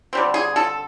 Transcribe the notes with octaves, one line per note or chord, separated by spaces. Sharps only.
D3 G3 C4
G#4
A4